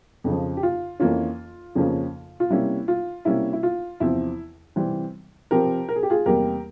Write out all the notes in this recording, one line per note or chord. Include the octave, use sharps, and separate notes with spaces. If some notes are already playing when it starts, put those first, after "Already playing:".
F2 C#3 F3
G4
F4
F2 E3 A#3 C#4 F4
F2 C#3 F3 A#3 C#4
F4
C3 G3 A#3 C#4 E4
F4
C3 G3 A#3 C#4 E4
E4
F4
E2 C3 F3 C4 E4
C3 E3 G3 C4
C3 F3 C4 G4 A#4
A#4
G#4
G4
F4 G#4
E2 C3 G3 A#3 G4 A#4